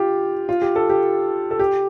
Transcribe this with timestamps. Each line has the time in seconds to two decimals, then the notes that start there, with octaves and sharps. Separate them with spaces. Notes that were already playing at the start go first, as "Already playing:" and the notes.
Already playing: F4 G4
0.49 F4
0.62 G4
0.76 A4
0.89 G4
1.51 A4
1.59 G4